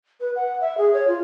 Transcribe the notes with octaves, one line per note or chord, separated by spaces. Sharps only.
B4
F#5
E5
G#4
C#5
F4